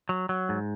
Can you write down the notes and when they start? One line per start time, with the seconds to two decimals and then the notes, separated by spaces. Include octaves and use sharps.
0.09 F#3
0.29 F#3
0.49 G#2